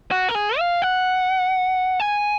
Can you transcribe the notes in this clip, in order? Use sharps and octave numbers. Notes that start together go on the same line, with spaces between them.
F#4
A#4
G#4
F5
F#5
G#5